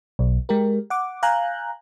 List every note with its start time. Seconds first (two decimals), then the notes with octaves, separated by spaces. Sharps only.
0.19 B1
0.49 G#3 G4 A#4
0.90 F#5 D6
1.23 F5 G#5 A#5 F#6 G6